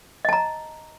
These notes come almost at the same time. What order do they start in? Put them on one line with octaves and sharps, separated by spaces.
D#5 A5 A#5